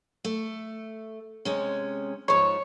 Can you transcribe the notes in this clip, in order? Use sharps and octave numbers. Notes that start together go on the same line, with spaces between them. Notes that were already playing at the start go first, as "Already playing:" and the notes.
A3
C3 G#3 C#4
G#2 F3 C#5